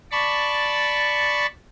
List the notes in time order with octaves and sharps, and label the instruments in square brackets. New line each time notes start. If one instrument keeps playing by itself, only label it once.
[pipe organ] D5 A5 B5 C#6